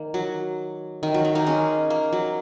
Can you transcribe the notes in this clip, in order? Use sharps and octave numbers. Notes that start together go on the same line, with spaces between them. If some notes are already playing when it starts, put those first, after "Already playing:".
Already playing: D#3 A#3
F#3
D#3
F#3
D#3
A#3 D#4
G#3 C#4
A#3
F#3